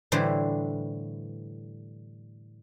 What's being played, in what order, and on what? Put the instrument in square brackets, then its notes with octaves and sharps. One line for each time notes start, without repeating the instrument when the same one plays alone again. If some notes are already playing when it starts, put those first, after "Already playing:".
[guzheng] A2 D3 E3 G3 C5